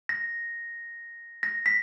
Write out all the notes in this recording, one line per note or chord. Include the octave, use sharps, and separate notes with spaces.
A#6
A#6
B6